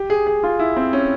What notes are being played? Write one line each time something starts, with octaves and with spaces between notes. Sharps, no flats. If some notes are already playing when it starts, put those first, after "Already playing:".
Already playing: G4
G#4
G#4
F4
E4
C4
C#4